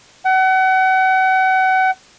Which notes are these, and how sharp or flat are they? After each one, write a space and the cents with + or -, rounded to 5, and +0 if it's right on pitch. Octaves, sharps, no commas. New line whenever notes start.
F#5 +35